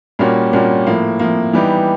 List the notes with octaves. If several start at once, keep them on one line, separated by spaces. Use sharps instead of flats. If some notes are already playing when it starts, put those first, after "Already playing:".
A#2 G3 A#3 C#4 F#4
A#2 G3 A#3 C#4 F#4
A2 F3 A#3
A2 F3 A#3
E3 G3 B3 D#4 G4